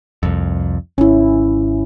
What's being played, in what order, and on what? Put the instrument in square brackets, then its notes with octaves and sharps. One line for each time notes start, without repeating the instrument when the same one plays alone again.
[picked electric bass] C2 F2
[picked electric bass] G#1 [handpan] C#4 E4